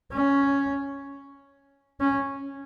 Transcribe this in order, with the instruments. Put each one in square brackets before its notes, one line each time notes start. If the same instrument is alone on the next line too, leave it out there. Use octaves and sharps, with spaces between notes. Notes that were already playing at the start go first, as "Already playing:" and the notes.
[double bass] C#4
C#4